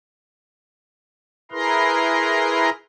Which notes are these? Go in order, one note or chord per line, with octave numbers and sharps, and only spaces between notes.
E4 G#4 A#4 B4 A#5 C6